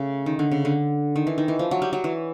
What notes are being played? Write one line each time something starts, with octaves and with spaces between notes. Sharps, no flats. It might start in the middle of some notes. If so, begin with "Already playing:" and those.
Already playing: C#3 A3
D#3
D3
C#3
D3
D#3
E3
D#3
E3
F3
F#3
G3
F#3
E3